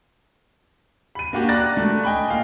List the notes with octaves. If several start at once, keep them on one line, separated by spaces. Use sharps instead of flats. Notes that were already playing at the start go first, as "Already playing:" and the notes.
B5 D#7
A#3 D4 F#4 G4
D5 A#5 B5 F#6 A6 A#6
A3
D#5 G5 G#5 B5
A#2 F5